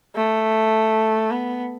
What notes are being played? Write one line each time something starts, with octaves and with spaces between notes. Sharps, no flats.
A3
B3